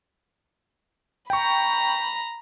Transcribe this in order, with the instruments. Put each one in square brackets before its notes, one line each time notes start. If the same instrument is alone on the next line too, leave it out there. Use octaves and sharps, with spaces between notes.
[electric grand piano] G5 C#6 [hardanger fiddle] A#5 B5